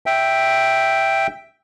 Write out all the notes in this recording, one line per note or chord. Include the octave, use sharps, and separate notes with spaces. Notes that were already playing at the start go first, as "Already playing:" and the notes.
E5 G5